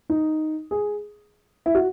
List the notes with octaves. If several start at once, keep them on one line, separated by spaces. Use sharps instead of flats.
D#4
G#4
E4
F#4